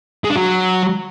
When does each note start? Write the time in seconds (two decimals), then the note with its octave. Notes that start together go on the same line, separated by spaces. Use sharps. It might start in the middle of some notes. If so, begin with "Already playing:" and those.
0.24 G#3
0.30 D4
0.36 F#3